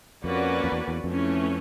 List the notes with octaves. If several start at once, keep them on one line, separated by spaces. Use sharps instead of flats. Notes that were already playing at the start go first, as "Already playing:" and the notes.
F2 A#3 C#4 F#4 B4 D5
F2
E2
E2
F2 E3 A3 C#4